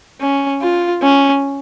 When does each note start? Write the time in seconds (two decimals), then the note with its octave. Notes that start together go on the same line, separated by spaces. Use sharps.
0.21 C#4
0.62 F4
1.02 C#4